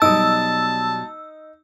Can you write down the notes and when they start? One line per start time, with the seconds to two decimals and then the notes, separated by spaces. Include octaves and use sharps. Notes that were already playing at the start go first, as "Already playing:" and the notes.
0.02 B2 F#3 G3 D#4 A5 D#6 E6